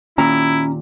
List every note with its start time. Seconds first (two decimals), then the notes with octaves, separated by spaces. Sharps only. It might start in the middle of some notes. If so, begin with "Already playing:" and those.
0.18 D#2 A#2 C#4 E4 A#5